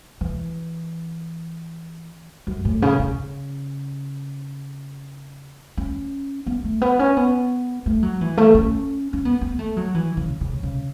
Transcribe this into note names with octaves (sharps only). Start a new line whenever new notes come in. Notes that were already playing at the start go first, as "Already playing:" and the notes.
E3
F#2
A2
C#3
C#3
C#4
B3
A3
B3
C#4
B3
A3
F#3
E3
A3
C#4
C#4
B3
B3
A3
F#3
E3
C#3
C#3
C#3